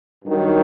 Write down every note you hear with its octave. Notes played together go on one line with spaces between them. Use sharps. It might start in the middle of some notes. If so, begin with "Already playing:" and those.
G2 D#3 F#3